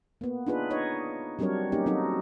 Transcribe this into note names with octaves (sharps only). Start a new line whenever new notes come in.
A#3 B3
D4 D#4 F4 G#4 B4
D#4 C#5 D#5
F#3 G3 C4 D4 A#4 C#5
A#3 C#4 D#4 G4
F#3 C4 D#4 F#4 A4